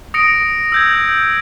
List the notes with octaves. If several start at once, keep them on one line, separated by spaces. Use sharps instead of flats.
D#6 A#6 C#7 D7
E6 G6 G#6